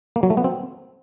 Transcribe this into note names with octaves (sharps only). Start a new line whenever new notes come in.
A#3
F#3
A3
B3
C4